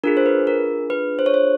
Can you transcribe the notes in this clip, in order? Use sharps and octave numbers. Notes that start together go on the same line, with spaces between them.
D4 F4 G#4 A#4
C5
B4
A#4
B4
C5
C#5
C5